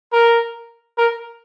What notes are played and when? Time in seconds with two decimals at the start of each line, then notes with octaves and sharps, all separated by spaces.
0.13 A#4
0.97 A#4